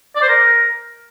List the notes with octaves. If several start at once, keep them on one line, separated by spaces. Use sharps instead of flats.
D5
C5
A#4